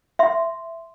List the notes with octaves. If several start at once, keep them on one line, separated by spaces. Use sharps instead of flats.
E5 C6